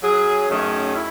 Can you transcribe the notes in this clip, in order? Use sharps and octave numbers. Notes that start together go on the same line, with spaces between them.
F#3 C#4 G#4
F#2 D#3 A3 C#4 G#4
E4